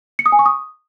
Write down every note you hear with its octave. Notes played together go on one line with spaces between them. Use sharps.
C#7
D#6
G#5
C#6
D#6